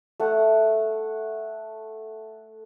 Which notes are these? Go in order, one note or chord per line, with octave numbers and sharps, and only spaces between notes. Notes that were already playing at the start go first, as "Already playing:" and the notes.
A3 F#5